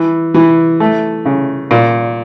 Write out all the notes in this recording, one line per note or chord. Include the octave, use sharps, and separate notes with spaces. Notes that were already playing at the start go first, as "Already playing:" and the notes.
Already playing: E3
E3
A3
C#3
A#2